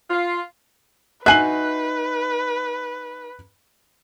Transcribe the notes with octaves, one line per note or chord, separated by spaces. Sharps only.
F4
D#4 F#4 B4 E5 G#5 F#6 C7 F#7